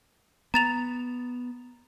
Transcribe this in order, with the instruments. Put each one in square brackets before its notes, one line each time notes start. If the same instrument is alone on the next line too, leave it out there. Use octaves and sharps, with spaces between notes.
[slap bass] B3 [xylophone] A#5 A6 F7